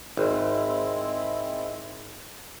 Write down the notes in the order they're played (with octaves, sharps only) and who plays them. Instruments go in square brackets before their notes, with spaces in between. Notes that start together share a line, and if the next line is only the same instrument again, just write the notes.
[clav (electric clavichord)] G#1 [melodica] G#3 C4 E4